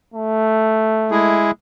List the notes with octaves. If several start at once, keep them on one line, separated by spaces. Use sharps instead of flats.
A3
G#3 E4 G#4